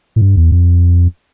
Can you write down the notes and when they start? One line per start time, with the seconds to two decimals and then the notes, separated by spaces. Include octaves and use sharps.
0.16 A2
0.22 G2
0.37 E2
0.52 F2